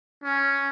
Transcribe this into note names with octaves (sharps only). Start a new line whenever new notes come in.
C#4